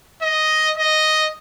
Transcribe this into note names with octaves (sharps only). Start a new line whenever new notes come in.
D#5
D#5